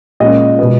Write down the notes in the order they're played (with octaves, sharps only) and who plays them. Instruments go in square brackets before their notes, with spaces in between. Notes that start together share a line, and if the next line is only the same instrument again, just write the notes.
[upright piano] A#2 G#3 C#4 F4 [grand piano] D#5
[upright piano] B2 G#3 B3